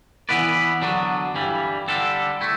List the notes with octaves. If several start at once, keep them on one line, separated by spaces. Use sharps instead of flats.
E3 B3 E4 B4 D5
D3 F#3 B3 D4
G2 E3 G3
D3 G3 D4 A4
A3 E4